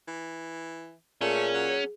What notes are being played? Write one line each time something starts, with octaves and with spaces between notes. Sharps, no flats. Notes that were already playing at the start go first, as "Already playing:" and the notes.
E3
A#2 A3 C#4 G#4
F#3